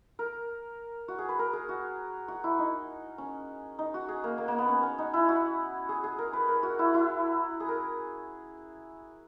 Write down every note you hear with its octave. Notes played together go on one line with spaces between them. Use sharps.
A#4
F#4
G#4
B4
A#4
G#4
F#4
F#4
E4
D#4
C#4
D#4
F#4
G#4
A#3
A#3
A#3
B3
C#4
C#4
D#4
E4
F#4
G#4
G#4
A#4
B4
A#4
F#4
E4
E4
G#4
A#4